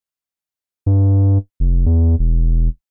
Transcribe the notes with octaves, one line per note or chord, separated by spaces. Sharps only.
G2
F1
E2
E1